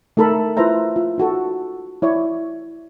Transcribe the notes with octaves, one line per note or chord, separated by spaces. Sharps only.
A3 D#4 A4 A#4 B5
E4 F4 B4 C5 E5 A#5
F4
D#4 F#4 A4
E4 C#5 D5 E5